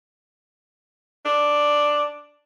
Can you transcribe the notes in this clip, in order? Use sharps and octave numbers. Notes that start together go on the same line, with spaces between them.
D4